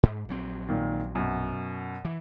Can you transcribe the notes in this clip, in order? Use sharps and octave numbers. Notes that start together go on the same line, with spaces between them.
G#2
A#1 F#3 C4
A#2 D#3
F#2 B2
E3